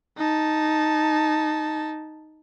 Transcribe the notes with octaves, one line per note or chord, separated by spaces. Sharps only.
D#4 A5